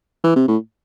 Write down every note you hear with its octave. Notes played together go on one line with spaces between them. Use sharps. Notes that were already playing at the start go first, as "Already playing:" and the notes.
E3
C3
A2